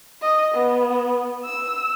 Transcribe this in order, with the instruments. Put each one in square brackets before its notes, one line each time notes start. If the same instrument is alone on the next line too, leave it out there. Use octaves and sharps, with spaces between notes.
[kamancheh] D#5
B3
E6